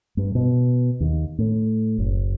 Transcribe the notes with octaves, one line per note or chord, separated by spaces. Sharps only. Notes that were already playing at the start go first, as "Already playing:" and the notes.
G2
B2
D#2
A2
F#1